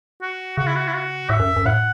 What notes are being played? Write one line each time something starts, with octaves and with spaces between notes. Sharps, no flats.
F#4
C#3 F#4
E4
F#4
E4
F#4
A2 E5
F#2
F#2
A2 F#5